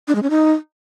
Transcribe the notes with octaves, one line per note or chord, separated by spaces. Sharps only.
D4
G#3
C#4
D#4